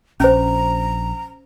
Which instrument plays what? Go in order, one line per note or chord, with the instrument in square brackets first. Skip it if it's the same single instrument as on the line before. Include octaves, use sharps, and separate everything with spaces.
[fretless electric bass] A#1 [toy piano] C#4 C5 [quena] A#5